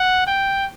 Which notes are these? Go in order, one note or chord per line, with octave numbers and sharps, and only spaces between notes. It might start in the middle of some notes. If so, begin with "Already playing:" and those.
Already playing: F#5
G5